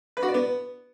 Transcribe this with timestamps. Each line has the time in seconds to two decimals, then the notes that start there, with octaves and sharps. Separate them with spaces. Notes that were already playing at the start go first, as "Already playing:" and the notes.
0.17 B4
0.23 F#4
0.28 D5
0.34 B3